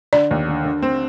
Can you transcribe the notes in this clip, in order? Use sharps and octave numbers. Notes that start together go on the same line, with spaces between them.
D3 D5
D#2
D3
D3
C4